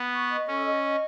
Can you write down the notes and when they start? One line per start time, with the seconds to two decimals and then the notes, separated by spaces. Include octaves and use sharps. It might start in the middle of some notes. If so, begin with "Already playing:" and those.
Already playing: B3
0.12 C#6
0.29 D#5
0.48 C#4 A4
0.66 D#5
0.83 D#5